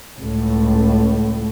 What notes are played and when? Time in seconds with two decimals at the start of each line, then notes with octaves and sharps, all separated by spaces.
0.20 C#2 A2